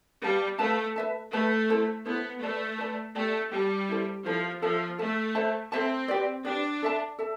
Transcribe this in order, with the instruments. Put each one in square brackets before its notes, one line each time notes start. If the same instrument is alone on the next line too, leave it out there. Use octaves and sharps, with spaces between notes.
[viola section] G3 [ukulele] B4 F5 A5
[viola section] A3 [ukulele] B4 F5 A5
[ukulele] B4 E5 A5
[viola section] A3 [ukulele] B4 E5 A5
[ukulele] E4 A4 C5
[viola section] B3 [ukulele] E4 A4 C5
[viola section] A3 [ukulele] B4 D5 A5
[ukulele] B4 D5 A5
[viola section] A3 [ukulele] G4 D5 A5
[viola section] G3 [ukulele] G4 D5 A5
[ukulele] E4 A4 C5
[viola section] F3 [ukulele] E4 A4 C5
[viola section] F3 [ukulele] A4 E5 A5
[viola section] A3 [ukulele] A4 E5 A5
[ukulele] A4 C5 E5 A5
[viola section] C4 [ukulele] A4 C5 E5 A5
[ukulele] G4 B4 D5
[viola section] D4 [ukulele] G4 B4 D5
[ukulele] A4 E5 A5
A4 E5 A5